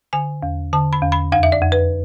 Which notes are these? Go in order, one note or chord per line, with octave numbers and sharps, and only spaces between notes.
D3 G#5
E2
D3 A5
B5
E2
B5
F2 F5
E5
D5
F2
B4